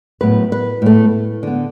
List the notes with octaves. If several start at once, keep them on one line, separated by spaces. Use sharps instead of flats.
A2 F#3 B3 B4
B4
A2 A3
D3 B3